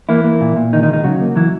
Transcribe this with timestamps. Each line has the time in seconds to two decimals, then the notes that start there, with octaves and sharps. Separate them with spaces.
0.09 E3 A#3 E4
0.24 A#3
0.41 A#2
0.56 A#2
0.73 C#2 D#3 D#4
0.83 D#3 D#4
0.88 C#2
0.93 D#3 D#4
1.04 C#3 F#3 F#4
1.21 A#3
1.36 E3 F#3 E4